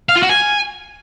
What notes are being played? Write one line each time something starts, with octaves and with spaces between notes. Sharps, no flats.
F5
F4
F#4
G#5